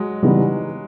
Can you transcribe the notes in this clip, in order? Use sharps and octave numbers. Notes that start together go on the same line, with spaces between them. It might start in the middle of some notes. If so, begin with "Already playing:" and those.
Already playing: F#3 G#3
C#3 E3 G3 B3 D#4